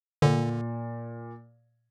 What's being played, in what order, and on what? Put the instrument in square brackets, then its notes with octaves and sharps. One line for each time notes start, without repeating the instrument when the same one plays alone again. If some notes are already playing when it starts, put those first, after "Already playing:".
[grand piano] A#2 [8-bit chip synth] D3